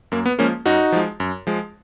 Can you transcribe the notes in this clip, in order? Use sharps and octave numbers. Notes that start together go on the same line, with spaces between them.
F#2 A#3
B3
F3 G#3 A#3 C#4
F#2 D#4 F#4
F3 G#3
F#2
F3 G#3